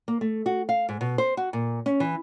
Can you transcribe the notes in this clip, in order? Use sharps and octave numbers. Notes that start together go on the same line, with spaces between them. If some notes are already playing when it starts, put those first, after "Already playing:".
A#3
A3
F#4
F5
G#2
B2
C5
F#4
A#2
C#4
E3